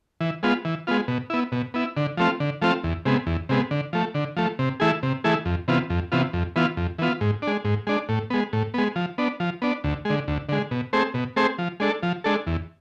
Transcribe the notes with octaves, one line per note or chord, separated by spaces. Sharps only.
E3
G#3 B3 F4
E3
G#3 B3 F4
B2
B3 E4
B2
B3 E4
D3
F3 A3 C4 F4
D3
F3 A3 C4 F4
E2
C3 G#3 B3
E2
C3 G#3 B3
D3
F3 A3
D3
F3 A3
C3
E3 A3 E4 G#4
C3
E3 A3 E4 G#4
F2
C3 E3 B3 F4
F2
C3 E3 B3 F4
F2
E3 B3 F4
F2
E3 B3 F4
G#2
G#3 D4
G#2
G#3 D4
A2
G#3 B3
A2
G#3 B3
F3
B3 D4
F3
B3 D4
D2
D3 G#3
D2
D3 G#3
B2
A3 C4 G#4 C5
B2
A3 C4 G#4 C5
F3
G#3 D4 A4
F3
G#3 D4 A4
E2